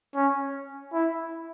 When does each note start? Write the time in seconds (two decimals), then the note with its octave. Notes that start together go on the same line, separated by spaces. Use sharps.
0.15 C#4
0.93 E4